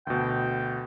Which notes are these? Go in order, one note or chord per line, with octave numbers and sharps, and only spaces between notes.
D2 B2 G5